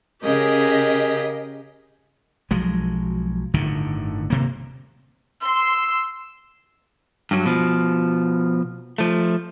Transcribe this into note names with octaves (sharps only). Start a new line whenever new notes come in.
C#3 G4 G#4 A#4 D#5 B6
B1 F3 F#3 G#3
G1 A2 D3 D#3
D#1 C3 A#3
C6 E6
G2 F#3
B2 F3
F3 A3